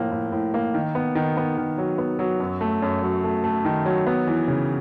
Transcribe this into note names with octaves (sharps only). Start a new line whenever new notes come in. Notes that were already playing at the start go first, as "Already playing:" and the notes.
Already playing: A2 F3 A#3
A2
A2
A#3
D#3
B3
D#3
B3
D#3
F#3
B3
F#3
F#2
A3
F#2
F#3
A3
A3
D#3
F#3
B3
E3
C#3